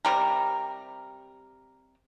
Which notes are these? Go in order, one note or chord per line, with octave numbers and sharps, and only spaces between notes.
C3 G3 A#4